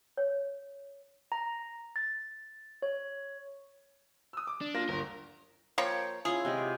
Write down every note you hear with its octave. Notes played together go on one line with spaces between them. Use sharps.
C#5
A#5
A6
C#5
D#6 E6
D6
D4
A#3 F4 A#6
G1 A#4
F3 A#3 C#5 G5
C#4 E4 F4 G#4
C3 G#3 G4